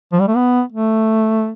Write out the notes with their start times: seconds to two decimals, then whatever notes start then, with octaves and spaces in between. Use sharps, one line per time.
0.13 F3
0.21 G3
0.28 A3
0.36 B3
0.72 A3